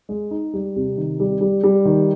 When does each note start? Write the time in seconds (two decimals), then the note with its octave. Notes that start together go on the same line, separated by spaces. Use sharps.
0.09 G#3
0.31 D#4
0.54 G3
0.76 C3
0.97 D#3
1.20 G3
1.41 G3
1.63 G3
1.85 D#3